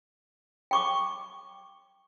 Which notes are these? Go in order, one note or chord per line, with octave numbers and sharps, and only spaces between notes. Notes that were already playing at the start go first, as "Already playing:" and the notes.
G5 C#6 D6